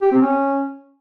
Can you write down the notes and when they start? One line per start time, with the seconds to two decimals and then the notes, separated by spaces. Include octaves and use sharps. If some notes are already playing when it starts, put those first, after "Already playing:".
0.02 G4
0.12 C4
0.22 C#4